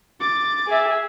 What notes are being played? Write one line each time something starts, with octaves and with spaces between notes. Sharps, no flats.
D6 A6
G#4 E5